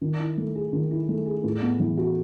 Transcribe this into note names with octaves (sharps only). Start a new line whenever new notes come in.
D#3
E4
A3
G#4
D#3
E4
A3
G#4
A2
B3
E3
F#4